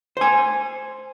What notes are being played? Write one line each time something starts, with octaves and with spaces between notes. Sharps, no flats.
C5 G#5